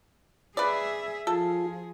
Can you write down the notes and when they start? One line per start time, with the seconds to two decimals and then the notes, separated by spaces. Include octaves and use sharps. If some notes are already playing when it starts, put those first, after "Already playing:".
0.57 G#4 B4 D5 E5
1.27 F3 F4 G#4 A4